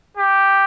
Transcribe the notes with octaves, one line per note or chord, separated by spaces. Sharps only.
G4